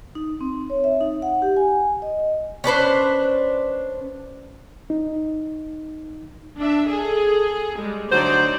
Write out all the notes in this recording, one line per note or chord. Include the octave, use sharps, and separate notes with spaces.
D#4
C4
C#5
E5
D#4
F#5
G4
G#5
D#5
C#4 D4 B4 C5
D#4
D4 E5
G#4 A4
G3 G#3
D2 F#3 D#4 C5 D5